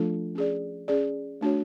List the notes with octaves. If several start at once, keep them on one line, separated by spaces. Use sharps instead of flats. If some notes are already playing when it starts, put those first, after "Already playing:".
Already playing: F3 A3 D4 F4 A4
C#4 G#4 D5
C#4 G#4 D5
A3 D4 F#4 C#5